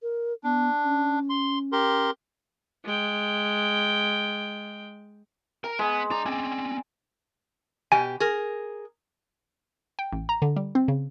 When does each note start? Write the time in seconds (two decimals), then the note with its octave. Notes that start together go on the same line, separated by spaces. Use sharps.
0.02 A#4
0.44 B3 D4
0.84 C#4
1.30 C6
1.72 G4 A#4 C6
2.85 G#3 G5
5.64 A#4 A#5
5.79 G#3 B3
6.10 D4 D5 A#5
6.26 C4 C#4 G#5
7.92 B2 G4 G#5
8.20 G#4 A#4
9.99 G5
10.12 A1
10.29 A#5
10.42 D3
10.56 G3
10.75 C4
10.88 C#3